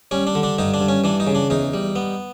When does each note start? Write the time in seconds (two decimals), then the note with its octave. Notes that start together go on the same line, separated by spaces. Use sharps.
0.11 G3 C#4
0.27 D4
0.35 D3
0.43 D4
0.58 G2 D#4
0.74 D4
0.81 G2
0.88 C#4
1.04 E3 D4
1.20 D#4
1.27 C#3
1.35 D4
1.50 E2 D#4
1.74 G3
1.96 B3